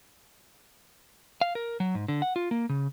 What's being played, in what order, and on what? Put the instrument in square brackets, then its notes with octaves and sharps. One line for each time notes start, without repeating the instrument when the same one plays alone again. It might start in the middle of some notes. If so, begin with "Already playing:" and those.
[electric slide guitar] F5
A#4
F#3
G#2
D3
F#5
F4
A#3
C#3